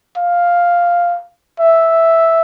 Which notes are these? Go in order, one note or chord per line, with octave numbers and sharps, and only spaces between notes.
F5
E5